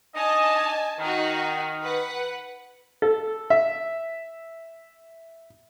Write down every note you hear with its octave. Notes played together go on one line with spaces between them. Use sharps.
D4 D#4 D#5 G#5 A5
D#3 D#4 F#4
B4 F#5
A4
E5